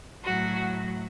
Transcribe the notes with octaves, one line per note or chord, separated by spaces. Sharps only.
A2 F#3 F#4